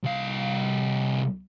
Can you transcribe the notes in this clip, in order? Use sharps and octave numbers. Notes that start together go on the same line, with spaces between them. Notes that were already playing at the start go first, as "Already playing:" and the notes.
C2 F5